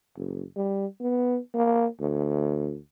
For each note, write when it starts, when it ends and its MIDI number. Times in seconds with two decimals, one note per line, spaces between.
0.17 0.43 30
0.56 0.86 55
1.00 1.38 59
1.54 1.86 58
2.00 2.77 38